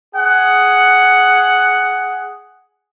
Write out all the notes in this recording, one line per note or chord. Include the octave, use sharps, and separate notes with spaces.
G#4 F#5